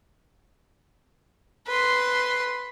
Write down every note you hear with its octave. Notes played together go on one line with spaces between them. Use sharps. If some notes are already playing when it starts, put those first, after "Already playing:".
B4 C6